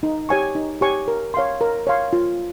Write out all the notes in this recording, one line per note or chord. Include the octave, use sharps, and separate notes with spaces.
D#4
G4 C#5 G#5 C#6
D#4
G4 C#5 G#5 C#6
A#4
C#5 F5 C6
A#4
C#5 F5 C6
F4